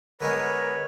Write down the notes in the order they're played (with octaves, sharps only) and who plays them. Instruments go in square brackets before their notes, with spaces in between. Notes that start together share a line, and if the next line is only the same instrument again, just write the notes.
[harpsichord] D3 G#3 B3 [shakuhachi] A#4 [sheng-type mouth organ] B4 C#5